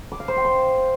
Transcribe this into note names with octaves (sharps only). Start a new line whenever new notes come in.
D6
F5
C5
G5
C6